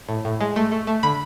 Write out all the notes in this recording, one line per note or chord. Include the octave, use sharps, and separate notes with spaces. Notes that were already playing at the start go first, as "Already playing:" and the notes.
A2
A2
G#3
A3
A3
A3
D3 B5